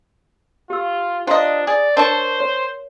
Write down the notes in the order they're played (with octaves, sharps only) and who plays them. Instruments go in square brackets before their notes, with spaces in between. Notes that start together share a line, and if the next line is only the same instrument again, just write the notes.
[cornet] F4 [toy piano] G4 E6
[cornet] D4 [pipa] F4 D#5 [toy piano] C5 A#5
[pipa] G#4 [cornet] D5
[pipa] D4 A5 C#6 [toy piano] A#4 C#5 [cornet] C5
[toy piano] C#5